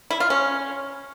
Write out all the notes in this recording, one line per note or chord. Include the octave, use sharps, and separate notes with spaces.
E4
F4
C#4